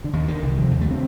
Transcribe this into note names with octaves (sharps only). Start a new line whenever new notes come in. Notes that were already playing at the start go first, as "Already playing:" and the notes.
D3
D#2 D#3
D3 D#3
C2
C3 F3
D#2
A3
D3 C4